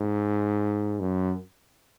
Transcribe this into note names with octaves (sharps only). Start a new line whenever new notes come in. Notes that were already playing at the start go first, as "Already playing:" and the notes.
Already playing: G#2
F#2